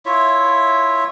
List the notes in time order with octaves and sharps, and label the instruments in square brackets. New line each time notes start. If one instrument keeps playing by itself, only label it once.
[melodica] E4 F4 C#5 E5